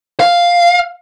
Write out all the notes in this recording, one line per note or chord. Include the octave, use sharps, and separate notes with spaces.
F5